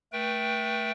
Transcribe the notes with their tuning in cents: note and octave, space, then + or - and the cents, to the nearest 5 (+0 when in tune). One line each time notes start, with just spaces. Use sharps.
A3 +5 B4 -40 G5 +0